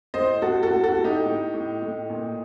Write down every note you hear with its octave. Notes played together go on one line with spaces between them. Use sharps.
A2 C5 D#5
A2 F#4 A4
F#4 A4
A2
F#4 A4
A2
D#4 G4
A2
A2
A2
A#2